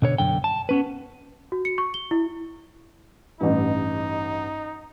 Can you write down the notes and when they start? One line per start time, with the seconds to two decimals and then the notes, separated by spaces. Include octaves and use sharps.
0.02 B2 D3 C#5
0.18 B1 F#2 D3 G5
0.44 A5
0.69 B3 C#4 B4
1.52 F#4
1.65 C#7
1.78 C#6
1.94 G7
2.11 E4
3.41 A1 G2 D#4